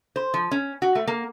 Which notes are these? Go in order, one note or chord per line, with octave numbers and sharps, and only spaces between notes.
C5
F3
C#4
F#4
A3
A#3